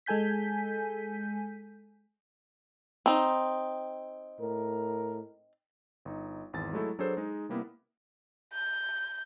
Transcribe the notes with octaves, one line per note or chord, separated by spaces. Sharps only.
G#3 A4 G#5 G6 B6
C4 D#4
A2 A#4
G1 D#4
G#1 E2 A6
F#3 G#3 A3 E4 A4
F#3 D4 G#4 A4 B4 C5
G#3 D#4
C3 G3 A#3 B3 E4
G6